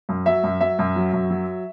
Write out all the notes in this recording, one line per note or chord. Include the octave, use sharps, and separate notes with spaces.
F#2
F#3 E5
F#2
F#3 E5
F#2
F#3
F#2
F#3